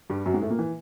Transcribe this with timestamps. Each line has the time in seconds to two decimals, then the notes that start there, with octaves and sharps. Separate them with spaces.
0.10 G2 G3
0.26 F#2 F#3
0.34 G#2 G#3
0.42 A2 A3
0.50 A#2 A#3
0.59 E3